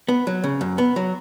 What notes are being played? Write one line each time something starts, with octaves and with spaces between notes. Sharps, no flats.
B3
F#3
C#3
F#2
B3
F#3